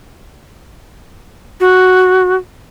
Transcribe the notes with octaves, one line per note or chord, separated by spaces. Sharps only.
F#4